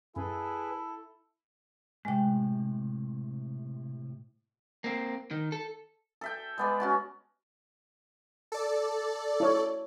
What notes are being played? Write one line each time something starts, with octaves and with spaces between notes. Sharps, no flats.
F#2 E4 G#4 A4 B4
A2 C3 G#3 G5
A#3 C4
D#3
A4
A4 E5 G5
G#3 B3 D5
C#4 F#4 A5
A4 D5
E4 C#5